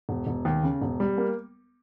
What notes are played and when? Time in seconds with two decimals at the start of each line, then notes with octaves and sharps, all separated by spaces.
0.09 E1
0.27 E1
0.45 D#2
0.63 C#3
0.82 E1
1.00 G3
1.18 A#3